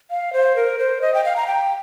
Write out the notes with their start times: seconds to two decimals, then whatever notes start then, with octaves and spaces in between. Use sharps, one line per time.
0.11 F5
0.33 C5
0.56 A#4
0.79 C5
1.02 D#5
1.14 G5
1.24 F5
1.36 A#5
1.47 G5